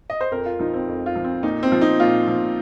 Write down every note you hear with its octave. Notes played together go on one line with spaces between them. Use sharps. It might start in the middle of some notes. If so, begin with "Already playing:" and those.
D#5
C5
F2 A#4
F4
F3 D#4
C4
F2
F4
F3
C4
A#2 D#4
C4
F3
D#4
A#2 F4
F3